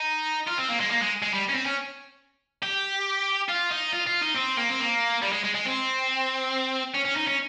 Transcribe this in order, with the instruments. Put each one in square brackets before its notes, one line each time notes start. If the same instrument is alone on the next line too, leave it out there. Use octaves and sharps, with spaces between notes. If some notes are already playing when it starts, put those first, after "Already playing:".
Already playing: [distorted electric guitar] D#4
F4
C4
A#3
G#3
A#3
G#3
G#3
G3
C#4
C4
C#4
G4
F4
D#4
F4
F4
D#4
C4
A#3
C4
A#3
G3
G#3
G#3
G#3
C4
C#4
C#4
D#4
C#4